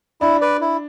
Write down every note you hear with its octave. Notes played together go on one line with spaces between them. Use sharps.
D4 E4
B4 D5
E4